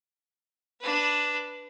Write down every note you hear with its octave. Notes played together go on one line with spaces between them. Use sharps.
D4 B4